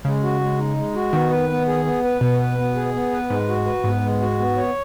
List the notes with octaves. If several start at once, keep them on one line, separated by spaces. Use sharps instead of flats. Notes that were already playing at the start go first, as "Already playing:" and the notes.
C#3 G#3
F#4
G#3
D#4
G#3
F#4
D#3 B3
B4
B3
G#4
B3
B4
B2 B3
B4
B3
G#4
B3
B4
G#2 G#3
F#4
B4
G#2 B3
G#3
F#4
B3
C#5